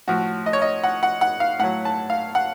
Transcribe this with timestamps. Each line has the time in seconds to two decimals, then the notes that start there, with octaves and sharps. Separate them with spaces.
0.08 A2 F3 F#4
0.46 D#5
0.53 C#5
0.62 D#5
0.84 F#5
1.03 F#5
1.21 F#5
1.40 F5
1.59 A2 F#3 F#5
1.85 A5
2.10 F5
2.35 F#5